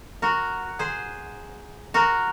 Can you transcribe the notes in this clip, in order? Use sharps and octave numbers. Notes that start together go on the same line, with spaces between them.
F#4 A#4
G#4 C5
F#4 A#4